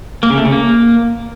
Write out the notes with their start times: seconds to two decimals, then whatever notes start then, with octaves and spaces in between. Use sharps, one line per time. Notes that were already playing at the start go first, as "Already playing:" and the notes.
0.23 A#3
0.30 C#3
0.38 A3
0.45 C#3
0.52 A#3